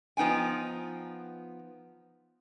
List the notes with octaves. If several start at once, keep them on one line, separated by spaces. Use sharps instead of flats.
F3 B3 D#4 G5 G#5